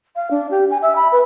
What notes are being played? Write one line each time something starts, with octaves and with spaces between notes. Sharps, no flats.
F5
D4
G4
G#5
E5
B5
B4